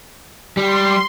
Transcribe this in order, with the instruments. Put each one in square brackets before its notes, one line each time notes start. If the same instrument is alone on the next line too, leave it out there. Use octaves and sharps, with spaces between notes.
[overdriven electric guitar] G3 [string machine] C6